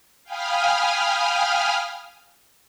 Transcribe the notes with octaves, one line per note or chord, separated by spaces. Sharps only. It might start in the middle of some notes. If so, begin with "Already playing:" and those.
F5 G5 G#5 B5 D#6 F6